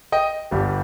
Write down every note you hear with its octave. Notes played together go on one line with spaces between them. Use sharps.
D#5 G5
G1 G2 G3